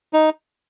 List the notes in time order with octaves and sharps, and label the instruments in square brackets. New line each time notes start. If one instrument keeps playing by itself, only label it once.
[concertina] D#4